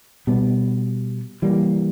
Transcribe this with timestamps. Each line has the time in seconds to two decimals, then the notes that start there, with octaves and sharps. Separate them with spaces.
0.27 B2 G3 B3
1.42 E3 G3 A#3